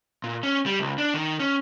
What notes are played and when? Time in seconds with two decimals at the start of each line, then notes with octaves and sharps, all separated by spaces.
0.24 A#2
0.43 C#4
0.66 G3
0.79 C#2
0.98 D4
1.14 D#3
1.40 C#4